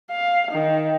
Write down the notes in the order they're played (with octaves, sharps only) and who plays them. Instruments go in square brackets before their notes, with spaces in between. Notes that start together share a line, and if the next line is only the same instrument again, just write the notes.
[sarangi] F5
D#3